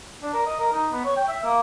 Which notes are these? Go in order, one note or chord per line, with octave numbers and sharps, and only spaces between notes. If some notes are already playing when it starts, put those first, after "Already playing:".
D4
A#4
D#5
A#4
D#4
B3
C#5
G5
E5
A#3